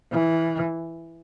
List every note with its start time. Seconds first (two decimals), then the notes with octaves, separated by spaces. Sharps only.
0.12 E3